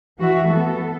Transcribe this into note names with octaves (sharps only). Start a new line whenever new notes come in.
E3 F#4 E5
B3 A4